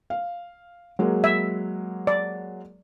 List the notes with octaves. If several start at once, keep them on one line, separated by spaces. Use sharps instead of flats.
F5
F#3 G#3 A#3
E5
D5